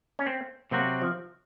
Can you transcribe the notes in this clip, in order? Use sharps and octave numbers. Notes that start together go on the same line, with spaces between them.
C#4
C4
C3 F#3 A#3 C4 F#4
F3